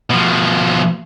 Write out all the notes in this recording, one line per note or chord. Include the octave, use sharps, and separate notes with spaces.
B2 F3